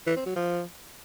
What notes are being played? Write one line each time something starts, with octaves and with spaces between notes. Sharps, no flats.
E3
C4
F#3
F3